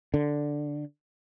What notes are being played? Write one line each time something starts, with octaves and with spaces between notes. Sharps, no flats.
D3